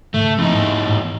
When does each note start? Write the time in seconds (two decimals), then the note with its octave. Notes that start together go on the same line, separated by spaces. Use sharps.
0.14 D2 G#2 C#3 A3
0.38 E2 F3 C4 C#4 D#4
0.54 G#2
0.89 G#2